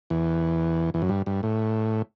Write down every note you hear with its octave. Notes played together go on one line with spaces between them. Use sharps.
E2
E2
F#2
G2
G2
A2